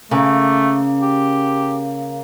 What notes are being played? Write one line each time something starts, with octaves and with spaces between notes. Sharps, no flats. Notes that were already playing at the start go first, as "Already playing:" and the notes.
C#3 A3 A#3 G#5
G4